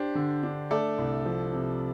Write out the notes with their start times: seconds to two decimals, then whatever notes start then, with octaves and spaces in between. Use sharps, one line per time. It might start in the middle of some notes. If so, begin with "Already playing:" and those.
Already playing: D4 G4 C5
0.15 D3
0.43 D4
0.70 A3 A4 D5
0.98 C2
1.25 F3
1.53 C3